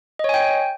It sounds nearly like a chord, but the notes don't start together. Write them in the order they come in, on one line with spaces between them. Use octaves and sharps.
D#5 C#5 G#5 G5